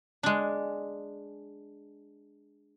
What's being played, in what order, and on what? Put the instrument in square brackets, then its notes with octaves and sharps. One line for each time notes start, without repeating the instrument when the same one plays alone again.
[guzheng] G#3 D4